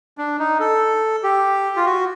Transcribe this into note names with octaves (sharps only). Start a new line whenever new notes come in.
D4
D#4
A4
G4
F4
F#4